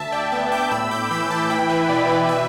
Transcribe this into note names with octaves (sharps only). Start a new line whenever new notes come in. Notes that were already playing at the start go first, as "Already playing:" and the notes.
Already playing: D2 E5 A5
D5 G5
B3 D5 G5
D6 G6
A2 B5 E6
D6 G6
E3 B5 E6
A5 D6
E4 G5 B5
B4 E5
B2 D5
B4
D5
B4 E5